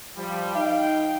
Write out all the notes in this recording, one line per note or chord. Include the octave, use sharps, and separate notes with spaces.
F3 G3
D#4 F5 G5